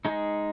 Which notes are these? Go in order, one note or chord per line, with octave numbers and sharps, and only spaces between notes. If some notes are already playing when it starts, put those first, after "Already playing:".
G#3 D#4